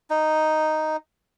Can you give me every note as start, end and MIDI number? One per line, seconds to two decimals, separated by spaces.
0.10 0.96 63